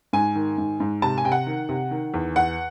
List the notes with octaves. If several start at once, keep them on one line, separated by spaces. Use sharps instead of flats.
G#2 G#5
D#3
G#2
G#2
C3 A5
G#5
C3 G5
F#5
D#3
C3
D#3
E2
E2 F#5